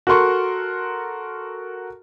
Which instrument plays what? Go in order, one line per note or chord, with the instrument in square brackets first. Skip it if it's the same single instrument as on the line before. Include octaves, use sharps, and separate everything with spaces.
[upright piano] F#4 A4 A#4 C6 C#6